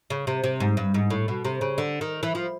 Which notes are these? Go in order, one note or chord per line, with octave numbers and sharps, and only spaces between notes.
C#3
C3
C3
G#2
G2
G#2
A2
B2
C3
C#3
D3
D#3
E3
F3